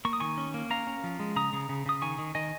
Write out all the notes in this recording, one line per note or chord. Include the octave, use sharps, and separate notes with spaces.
A#3 C#6
D#6
D#3 G#5 C#6
C#4
A#3
C#4 F5 A#5
C#4
F3
G#3
C#3 A#5 D#6
C#3
C#3
C#3 D#6
D#3 G#5 C#6
D#3
D#3 D#5 G#5